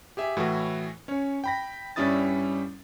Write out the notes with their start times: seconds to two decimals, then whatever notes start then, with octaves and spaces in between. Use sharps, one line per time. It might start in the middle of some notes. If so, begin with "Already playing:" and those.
0.17 G4 G#4 E5
0.37 A2 E3 E4 F#4
1.08 C#4 C#5
1.44 G5 B5 A#6
1.96 G2 G3 C#4 E4 D#6 A6